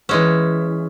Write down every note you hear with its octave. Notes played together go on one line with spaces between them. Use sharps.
E3 G#3 C#4